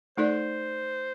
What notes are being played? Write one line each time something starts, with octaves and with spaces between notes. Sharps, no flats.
A3 D#4 A4 C5 D5